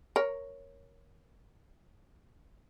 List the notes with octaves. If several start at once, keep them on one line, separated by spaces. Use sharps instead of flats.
A#4 C#5